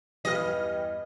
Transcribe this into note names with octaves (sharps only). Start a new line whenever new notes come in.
E2 G2 E3 G4 B4 D#5 F6